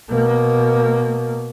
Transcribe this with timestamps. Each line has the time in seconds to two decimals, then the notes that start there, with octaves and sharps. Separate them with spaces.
0.11 B2 A#3